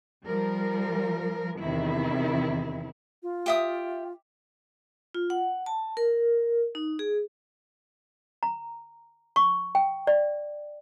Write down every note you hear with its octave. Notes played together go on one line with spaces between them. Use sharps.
F3 G3 A#4
E2 C3 D#3 E4
F4
G4 E5 D#6
F4
F#5
A5
A#4
D#4
G#4
A#5
C#6
G5
D5